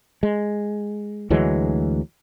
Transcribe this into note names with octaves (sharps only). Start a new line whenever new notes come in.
G#3
D2 E3 F#3 G#3